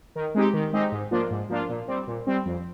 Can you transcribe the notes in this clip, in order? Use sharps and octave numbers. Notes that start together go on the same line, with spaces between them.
D#3
G#3 C4 D#4 G4
D#3
G#3 C4 D#4 G4
G#2
F3 A#3 D4 F4
G#2
F3 A#3 D4 F4
A#2
G3 C4
A#2
G3 C4
F2